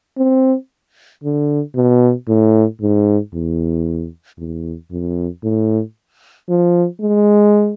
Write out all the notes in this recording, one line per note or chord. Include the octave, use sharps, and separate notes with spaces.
C4
D3
B2
A2
G#2
E2
E2
F2
A2
F3
G#3